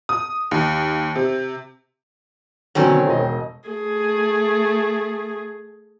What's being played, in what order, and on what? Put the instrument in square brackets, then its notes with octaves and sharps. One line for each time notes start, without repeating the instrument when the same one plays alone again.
[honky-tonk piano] D#6
D#2
C3
[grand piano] B2 D3 F#3 [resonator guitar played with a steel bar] D#3 C4 C#4
[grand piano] E1 D#5
[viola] A3 G#4